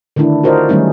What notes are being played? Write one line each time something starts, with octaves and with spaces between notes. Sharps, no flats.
D3 D#3 A3 D4 E4
F4 F#4 A#4 C5 D5 D#5
D#3 F#3 G3 A3 C#4 D#4